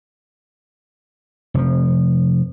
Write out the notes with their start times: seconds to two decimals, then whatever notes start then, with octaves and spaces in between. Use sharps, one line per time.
1.54 F1 F3